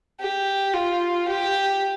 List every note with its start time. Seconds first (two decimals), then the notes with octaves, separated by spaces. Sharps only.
0.20 G4
0.74 F4
1.28 G4